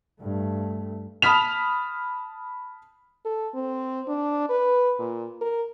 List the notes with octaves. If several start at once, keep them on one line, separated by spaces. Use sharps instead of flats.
G2 A3
A5 B5 D#6 F6 B6 F7
A4
C4
D4
B4
A#2
A#4